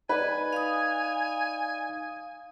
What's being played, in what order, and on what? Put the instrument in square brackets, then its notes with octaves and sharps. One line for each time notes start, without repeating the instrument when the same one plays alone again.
[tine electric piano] D#4 D5 [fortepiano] B4 [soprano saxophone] G#5
[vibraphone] F5 D#6